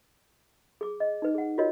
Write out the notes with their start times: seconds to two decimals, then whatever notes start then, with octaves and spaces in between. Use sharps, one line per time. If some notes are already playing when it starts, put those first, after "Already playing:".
0.81 G#4 D6
1.00 D#5
1.22 D#4 B4
1.35 G#4 F#5
1.58 F4 F#4 A#4 C#5 D#5